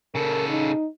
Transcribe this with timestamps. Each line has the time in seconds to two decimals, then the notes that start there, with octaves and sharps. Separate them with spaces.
0.15 C#3 A4 A#4
0.49 D#4